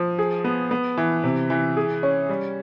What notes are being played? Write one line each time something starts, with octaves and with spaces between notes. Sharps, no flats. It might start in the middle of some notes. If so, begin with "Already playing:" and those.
Already playing: F3
G#4
B3
B3
E3
C3
E3
G#4
C#4
G3